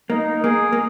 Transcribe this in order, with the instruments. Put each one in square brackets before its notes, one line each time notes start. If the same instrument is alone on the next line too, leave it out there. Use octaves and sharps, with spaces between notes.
[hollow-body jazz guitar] A#3 [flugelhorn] D#4
[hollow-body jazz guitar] A#3 [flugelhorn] G#4
[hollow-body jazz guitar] A#3